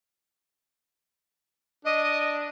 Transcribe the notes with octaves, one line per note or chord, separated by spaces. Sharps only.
D4 D#5